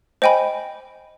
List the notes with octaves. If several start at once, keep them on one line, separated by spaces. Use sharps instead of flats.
C5 D#5 G5 G#5 B5